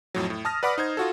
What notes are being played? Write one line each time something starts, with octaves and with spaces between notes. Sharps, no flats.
F2 A2 F#3
A2
A5 D#6 F6 A#6
B4 D5 F#5 B5 D6 F6
D#4 C5 G#6
F4 F#4 A4